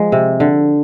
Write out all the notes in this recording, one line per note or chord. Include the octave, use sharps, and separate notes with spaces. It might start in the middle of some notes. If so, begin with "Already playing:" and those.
Already playing: F3 G#3
C3
D3